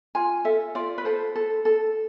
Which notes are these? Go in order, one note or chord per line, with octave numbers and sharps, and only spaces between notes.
F4 G#5
A4 E5
F4 D5
B4
A4 C5
A4
A4